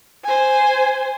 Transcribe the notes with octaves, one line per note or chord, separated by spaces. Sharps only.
C5 G#5